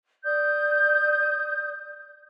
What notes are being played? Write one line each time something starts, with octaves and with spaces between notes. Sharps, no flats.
D5 D#6 G6